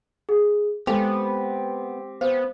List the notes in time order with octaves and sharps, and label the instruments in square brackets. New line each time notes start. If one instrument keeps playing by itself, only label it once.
[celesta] G#4
[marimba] G#3 A4 F5 [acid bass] B3 [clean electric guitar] C4 G4 [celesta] F7
[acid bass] B3 [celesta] C5 [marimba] F5